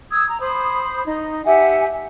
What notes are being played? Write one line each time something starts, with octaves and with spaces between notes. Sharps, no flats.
D#6 E6 G#6
A#5
C5 B5 D#6
D#4
G4 E5 F#5 G#5